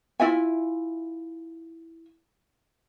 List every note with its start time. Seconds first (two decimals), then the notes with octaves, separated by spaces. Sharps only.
0.20 E4 F4 E5 G#5